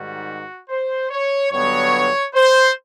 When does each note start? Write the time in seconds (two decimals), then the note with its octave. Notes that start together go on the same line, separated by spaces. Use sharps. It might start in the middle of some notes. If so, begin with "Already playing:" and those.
Already playing: G#2 D#3 G3 F#4
0.69 C5
1.10 C#5
1.51 G2 D3 F#3 B3 C#5
2.34 C5